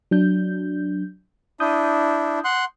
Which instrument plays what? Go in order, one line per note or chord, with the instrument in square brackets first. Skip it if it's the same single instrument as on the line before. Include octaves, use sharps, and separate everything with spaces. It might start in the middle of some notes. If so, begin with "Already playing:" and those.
[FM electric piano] F#3 D4 G6
[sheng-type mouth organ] D4 E4 [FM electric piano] D#6 G6
[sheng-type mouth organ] F#5 C6 F#6